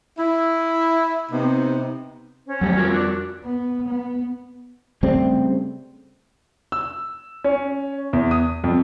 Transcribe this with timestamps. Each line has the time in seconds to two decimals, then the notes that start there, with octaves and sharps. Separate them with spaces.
0.18 E4
1.30 C3 B3 D#4
2.46 C#4 C5
2.61 F2 F#3 G3 A3 G4
2.77 F4 F#4 A#4
2.92 D4 C#6 F#6
3.44 B3
3.88 B3
5.03 C#3 G3 A3 C4
6.72 E6
7.44 C#4
8.13 E2
8.31 D#6
8.64 F2